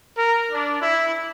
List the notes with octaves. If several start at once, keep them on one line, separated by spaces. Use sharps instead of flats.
A#4
D4
E4